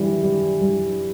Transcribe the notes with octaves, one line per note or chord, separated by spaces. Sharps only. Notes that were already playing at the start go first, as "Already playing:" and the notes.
Already playing: E3 G3
G3
G3